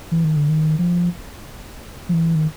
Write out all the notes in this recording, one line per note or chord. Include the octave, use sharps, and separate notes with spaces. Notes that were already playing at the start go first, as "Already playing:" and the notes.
E3
D#3
D3
D#3
F3
F3
E3
D#3